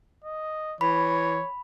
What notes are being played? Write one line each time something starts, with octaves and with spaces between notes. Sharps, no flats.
D#5
E3 C#5 B5